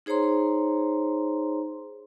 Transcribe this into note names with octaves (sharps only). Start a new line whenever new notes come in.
D#4 G#4 C5 C#5 A#5 C6